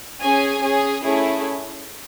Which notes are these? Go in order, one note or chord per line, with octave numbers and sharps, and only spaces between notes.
C#4 G#4 G#5
C#4 G#4
A3 C#4 E4 G#4